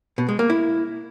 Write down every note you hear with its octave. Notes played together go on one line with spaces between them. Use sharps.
B2
G#3
A#3
E4